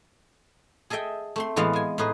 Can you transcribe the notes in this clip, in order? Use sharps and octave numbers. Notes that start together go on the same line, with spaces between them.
G#4 A4 D#5 E5 G5
A3 C4 C6
A2 E3 G#3 B3 A4 F5
G#3 G#5
A2 D#4 G#4 B4 C5